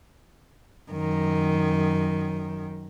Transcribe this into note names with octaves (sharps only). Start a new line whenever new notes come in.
F#2 D#3